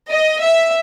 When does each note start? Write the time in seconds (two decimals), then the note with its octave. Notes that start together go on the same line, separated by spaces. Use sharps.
0.10 D#5
0.42 E5